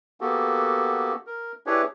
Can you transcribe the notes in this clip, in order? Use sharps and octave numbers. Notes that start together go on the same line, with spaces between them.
A#3 B3 F#4 G4 A4
A#4
D4 E4 G4 G#4 B4 C#5